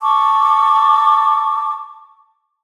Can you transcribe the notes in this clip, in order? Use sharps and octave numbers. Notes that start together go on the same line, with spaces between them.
A5 C#6 D6 E6